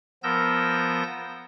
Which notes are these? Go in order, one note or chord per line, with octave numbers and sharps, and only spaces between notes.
F3 B3 A#4 E6 G6 A#6